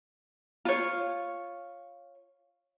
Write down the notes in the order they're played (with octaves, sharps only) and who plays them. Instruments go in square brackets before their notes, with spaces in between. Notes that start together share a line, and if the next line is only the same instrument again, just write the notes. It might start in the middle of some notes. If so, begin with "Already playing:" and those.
[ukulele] F4 C#5